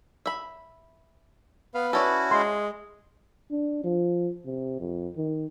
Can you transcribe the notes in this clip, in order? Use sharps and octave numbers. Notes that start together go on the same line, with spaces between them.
E5 B5
B3 B4 F5
C#4 E4 F#4 A4 C#5 D5
G#3 C6
D4
F3
C3
F2
D#3